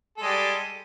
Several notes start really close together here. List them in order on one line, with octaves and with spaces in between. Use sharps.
A4 G#3 G3